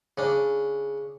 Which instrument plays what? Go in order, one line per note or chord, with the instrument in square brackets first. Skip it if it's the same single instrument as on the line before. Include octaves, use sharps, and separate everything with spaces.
[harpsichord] C#3 D4